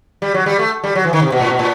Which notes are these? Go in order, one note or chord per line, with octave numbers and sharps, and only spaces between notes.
G3
F#3
G3
A3
G3
F#3
E3
D#3
C3
B2
A2
B2
A2